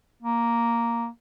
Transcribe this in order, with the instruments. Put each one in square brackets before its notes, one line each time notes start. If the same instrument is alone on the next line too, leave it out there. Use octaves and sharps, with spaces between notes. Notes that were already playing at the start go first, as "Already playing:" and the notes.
[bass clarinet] A#3